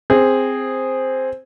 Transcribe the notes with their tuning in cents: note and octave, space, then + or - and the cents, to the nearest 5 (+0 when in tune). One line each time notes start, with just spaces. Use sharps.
C4 +0 G#4 -10